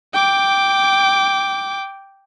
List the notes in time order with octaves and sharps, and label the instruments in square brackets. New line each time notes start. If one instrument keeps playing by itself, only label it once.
[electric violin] G5 D6